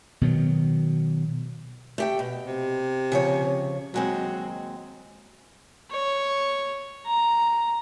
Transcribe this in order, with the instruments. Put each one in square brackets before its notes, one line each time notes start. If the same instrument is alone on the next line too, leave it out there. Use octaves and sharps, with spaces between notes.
[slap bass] B2 D#3 F#3
[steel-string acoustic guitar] A3 G4 G5
B2
[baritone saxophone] C3
[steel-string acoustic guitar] C#3 F3 C#5
[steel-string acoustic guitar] D#2 G#3 C4 [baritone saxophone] F#3
[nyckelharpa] C#5
A#5